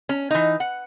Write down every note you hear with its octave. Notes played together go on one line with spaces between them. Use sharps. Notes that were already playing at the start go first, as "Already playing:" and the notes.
C#4
E3 D#4
F#5